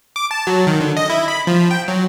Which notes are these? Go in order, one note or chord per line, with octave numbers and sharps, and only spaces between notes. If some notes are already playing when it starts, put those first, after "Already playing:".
D6
A5
F#3
D#3
D3
D#5
E4
B5
F3
G5
F#3